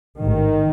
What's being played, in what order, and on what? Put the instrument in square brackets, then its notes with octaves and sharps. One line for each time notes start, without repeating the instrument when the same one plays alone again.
[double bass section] A1 G#2 D#3